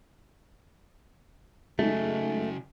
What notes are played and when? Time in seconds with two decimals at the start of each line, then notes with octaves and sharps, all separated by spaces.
1.79 C#3 F#3 G#3 A3 D#4